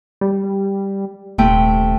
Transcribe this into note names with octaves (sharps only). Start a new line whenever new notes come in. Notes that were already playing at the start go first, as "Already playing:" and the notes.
G3
D#1 C3 A3 G5